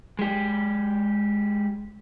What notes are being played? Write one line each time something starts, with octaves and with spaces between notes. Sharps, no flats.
G#3 G4